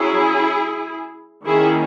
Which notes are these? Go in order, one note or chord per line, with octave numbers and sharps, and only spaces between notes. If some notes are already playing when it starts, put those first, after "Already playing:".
Already playing: F#3 C#4 E4 G#4
D#3 A#3 C#4 E4 G#4